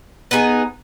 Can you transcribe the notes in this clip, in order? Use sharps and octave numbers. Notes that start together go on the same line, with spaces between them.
B3 D#4 G#4